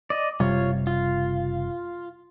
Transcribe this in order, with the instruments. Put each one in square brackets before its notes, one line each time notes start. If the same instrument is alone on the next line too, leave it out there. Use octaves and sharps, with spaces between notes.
[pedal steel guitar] D5 D#5
[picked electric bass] F#1 C3 G3 [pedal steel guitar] F4 C#5
[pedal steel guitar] F4